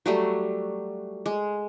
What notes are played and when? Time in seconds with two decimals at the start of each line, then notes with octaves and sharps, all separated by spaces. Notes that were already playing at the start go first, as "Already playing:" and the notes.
0.06 F#3 G3 A3
1.26 G#3